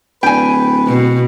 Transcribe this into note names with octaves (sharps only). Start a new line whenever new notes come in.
D1 B4 G5 G#5
B2